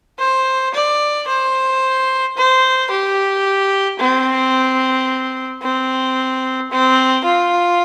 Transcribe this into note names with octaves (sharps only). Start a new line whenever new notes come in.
C5
D5
C5
C5
G4
C4
C4
C4
F4